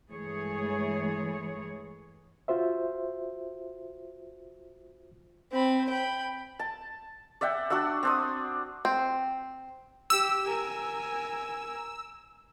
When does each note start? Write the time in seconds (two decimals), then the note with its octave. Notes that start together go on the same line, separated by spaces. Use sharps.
0.11 G2 E3 G#3 A3 G#4 C#5
2.48 F4 F#4 C5 E5
5.52 C4 B5
5.89 G5 B5
6.59 A5
7.41 D5 E5 F#5 G5
7.70 D4 F#4 F#5 E6
8.03 C4 D4 D#6
8.85 C4
10.10 G4 E6
10.45 A#4 G#5